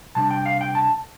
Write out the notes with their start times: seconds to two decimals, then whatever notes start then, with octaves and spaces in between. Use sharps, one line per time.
0.15 C3 G3 D4 A5
0.31 G5
0.46 F5
0.61 G5
0.75 A5